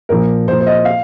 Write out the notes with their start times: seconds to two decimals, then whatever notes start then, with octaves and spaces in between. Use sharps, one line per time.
0.09 A#2 F3 A#4
0.47 A#2 F3 C5
0.60 C5
0.66 D#5
0.85 F5